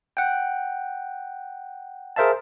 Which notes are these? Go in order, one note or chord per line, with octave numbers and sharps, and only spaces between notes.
F#5 G5
G#4 A#4 C5 E5 F5 A5